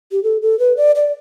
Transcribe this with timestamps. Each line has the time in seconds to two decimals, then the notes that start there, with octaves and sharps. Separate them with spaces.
0.12 G4
0.23 A4
0.42 A4
0.59 B4
0.77 D5
0.96 D5